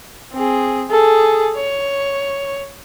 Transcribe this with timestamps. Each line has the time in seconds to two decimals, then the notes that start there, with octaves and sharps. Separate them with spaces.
0.33 C4 G#4
0.90 G#4 A4
1.56 C#5